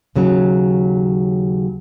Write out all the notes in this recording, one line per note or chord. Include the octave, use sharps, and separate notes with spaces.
D#2 C#3 F#3